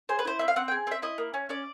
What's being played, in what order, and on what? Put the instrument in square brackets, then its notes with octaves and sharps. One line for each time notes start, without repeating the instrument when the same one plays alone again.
[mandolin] G#4 C5
B4
E4 C5
C4 E5
F5
C4 F#5
G5
G#4
C4 E5
E4 D#5
A#3
C#4
C#4 D5